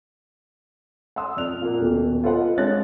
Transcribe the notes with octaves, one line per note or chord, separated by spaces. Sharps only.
F#5 C6 D#6 E6
F2 D5 F6 F#6 F7
A#2 A#3
D#1 B2
F4 A4 B4 C5 D#5 F#5
C2 G#3 D4 C#5 F#6 A6